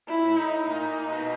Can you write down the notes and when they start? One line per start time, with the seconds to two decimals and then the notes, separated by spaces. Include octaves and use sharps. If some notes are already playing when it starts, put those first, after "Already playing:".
0.08 E4
0.23 A2
0.37 D#4
0.66 A#2 D#4
1.10 B2